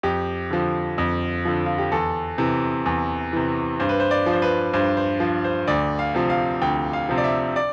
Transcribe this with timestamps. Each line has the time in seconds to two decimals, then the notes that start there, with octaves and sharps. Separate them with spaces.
0.03 F2 G4
0.50 D3 F3
0.98 F2
1.45 D3 F3
1.66 F4
1.78 G4
1.92 E2 A4
2.38 C3 E3
2.86 E2
3.33 C3 E3
3.80 G2 C5
3.89 B4
4.00 C5
4.11 D5
4.26 F3
4.33 C5
4.42 B4
4.73 G2 C5
4.97 C5
5.20 F3
5.44 C5
5.67 D2 D5
5.99 F5
6.15 C3 F3
6.30 F5
6.62 D2 G5
6.93 F5
7.09 C3 F3
7.18 D5
7.24 E5
7.56 D5